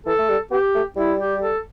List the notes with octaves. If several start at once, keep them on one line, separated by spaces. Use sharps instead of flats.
E3 A4
A3
G3
B3 G4
A3
G3 E4
G4
A4